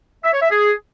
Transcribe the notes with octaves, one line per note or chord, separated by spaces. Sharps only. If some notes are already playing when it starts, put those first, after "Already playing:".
E5
C#5
E5
G#4